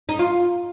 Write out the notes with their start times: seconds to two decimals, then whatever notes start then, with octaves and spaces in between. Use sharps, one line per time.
0.09 D#4
0.19 F4